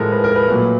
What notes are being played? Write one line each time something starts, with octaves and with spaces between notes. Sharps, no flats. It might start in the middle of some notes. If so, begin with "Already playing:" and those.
Already playing: A2 F3 G#3 A4 A#4
B4
A#4
B4
A#2 F#3 A3